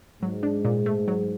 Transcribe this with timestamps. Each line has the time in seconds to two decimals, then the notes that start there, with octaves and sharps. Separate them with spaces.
0.22 G#2 F#3
0.43 D4
0.65 A#2
0.86 A3
1.08 F#3